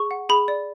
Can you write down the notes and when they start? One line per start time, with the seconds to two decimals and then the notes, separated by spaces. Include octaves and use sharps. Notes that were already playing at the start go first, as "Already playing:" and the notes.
Already playing: G#4 C#6
0.11 F#5
0.29 G#4 B5
0.48 D5